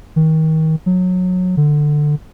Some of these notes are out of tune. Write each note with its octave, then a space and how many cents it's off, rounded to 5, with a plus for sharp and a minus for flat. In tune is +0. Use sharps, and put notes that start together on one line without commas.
D#3 +30
F#3 -20
D3 +15